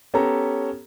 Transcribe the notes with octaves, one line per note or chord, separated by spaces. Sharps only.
B3 C#4 G4 A4 A#5